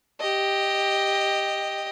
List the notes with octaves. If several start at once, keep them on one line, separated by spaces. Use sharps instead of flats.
G4 D#5